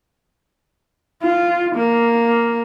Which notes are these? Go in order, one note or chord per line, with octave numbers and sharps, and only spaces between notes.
F4
A#3